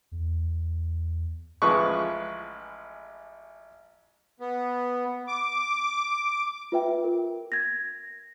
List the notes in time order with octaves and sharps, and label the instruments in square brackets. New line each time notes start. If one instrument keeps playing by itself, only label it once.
[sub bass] E2
[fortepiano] A1 F3 G#3 B4 C#6
[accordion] B3
D6
[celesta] F4 B4 E5 G5
A#4
G#6 A#6